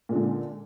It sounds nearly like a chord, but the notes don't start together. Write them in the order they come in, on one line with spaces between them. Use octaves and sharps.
A#2 G#3 D3